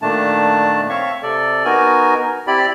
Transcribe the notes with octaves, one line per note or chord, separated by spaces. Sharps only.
A#2 D#3 A3 D4 A5
C4 C#5 E5 F5 C#6
C3 A4 D5
B3 D#4 F#4 A#4 G#5
C4 E4 G4 D5 B5